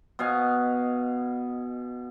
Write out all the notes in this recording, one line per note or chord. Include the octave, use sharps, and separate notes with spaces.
B2 D#5 F5 G#5